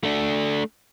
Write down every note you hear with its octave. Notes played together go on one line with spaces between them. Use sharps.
A3 D4